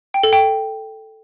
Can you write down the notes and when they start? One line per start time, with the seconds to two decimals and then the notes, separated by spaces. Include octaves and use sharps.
0.14 G5
0.23 A4
0.33 G5